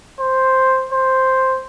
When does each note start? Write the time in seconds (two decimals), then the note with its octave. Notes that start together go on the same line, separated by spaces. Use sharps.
0.20 C5
0.93 C5